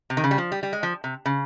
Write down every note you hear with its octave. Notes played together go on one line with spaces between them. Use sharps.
C3
D#3
C#3
G3
F3
G3
G3
G#3
F3
C3
C#3